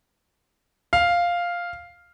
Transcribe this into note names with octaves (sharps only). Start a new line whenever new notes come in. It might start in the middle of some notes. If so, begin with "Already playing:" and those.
F5